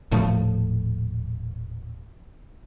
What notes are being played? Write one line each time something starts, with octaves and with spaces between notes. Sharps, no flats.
D#1 A2 F3 A3